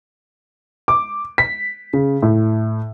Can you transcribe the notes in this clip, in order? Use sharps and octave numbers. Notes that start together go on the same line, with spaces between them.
D6
B6
C#3
A2